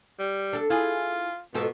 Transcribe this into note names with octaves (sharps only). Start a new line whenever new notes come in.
G3
D4 A4
E4 F4 G#4
G#2 B2 F3 A4